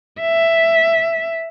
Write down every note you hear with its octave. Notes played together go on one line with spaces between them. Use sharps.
E5